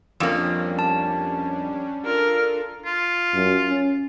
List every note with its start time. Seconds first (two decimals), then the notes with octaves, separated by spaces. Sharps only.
0.20 F2 G3 A#3 C#4 D4
0.79 A5
2.05 D4 F4 A4 A#4
2.86 F4
3.34 F#2
3.69 C#4